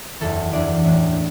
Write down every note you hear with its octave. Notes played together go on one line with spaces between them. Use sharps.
F#1 E2 E3 A4
F#1 E2 E3 D4 D5
A1 A2 E3 D4